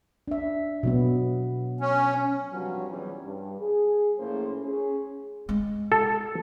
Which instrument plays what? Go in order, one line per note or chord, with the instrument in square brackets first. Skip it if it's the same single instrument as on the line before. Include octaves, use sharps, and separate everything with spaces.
[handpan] D4 E5
B2 F#3 B3
[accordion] C#4
[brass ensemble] G2 C3 F3 F#3
E2 G3 C#4 C#5
G2
G#4
A2 F3 A#3 C#4 C5
C#4 G#4
[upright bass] G#3
[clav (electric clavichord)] A4